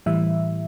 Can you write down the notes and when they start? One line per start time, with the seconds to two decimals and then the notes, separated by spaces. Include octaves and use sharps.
0.06 A2 E3 G3 E5